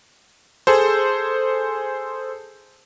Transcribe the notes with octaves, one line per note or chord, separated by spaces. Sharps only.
G#4 A4 C5